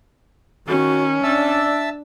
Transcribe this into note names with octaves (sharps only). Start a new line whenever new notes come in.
D#3 C#4 F#4
D4 D5 E5 A5 E6